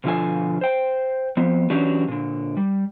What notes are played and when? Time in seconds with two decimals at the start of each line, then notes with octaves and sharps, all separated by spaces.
0.04 B2 D3 F3 F4 A4 G#5
0.61 C5 G5
1.37 F3 B3 C4
1.70 E3 F#3 C#4 D4 F#4 G4
2.08 A#2 D3
2.57 G3